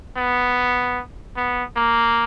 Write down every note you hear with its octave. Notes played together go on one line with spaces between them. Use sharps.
B3
B3
A#3